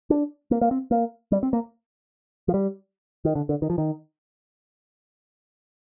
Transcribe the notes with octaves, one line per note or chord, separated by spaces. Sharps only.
D4
A#3
A#3
C4
A#3
G3
C4
A#3
F3
G3
D#3
D3
D3
D#3
F3
D#3